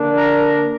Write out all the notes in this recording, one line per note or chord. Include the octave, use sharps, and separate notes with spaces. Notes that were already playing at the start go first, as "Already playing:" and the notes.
Already playing: D3 A#3 D4
A#4